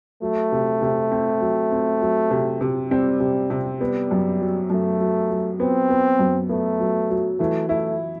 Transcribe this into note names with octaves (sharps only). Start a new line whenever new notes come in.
F#3 A3
C3
C3
C4
F#3
C4
F#3
C3
C3
G3 C4
C3
C3
G3 B3
F#2
F#3
F#2 A3
F#3
F#3
B3 C4
B3
F#2
A3 B3
F#3
F#3
E3 A3
A3 E4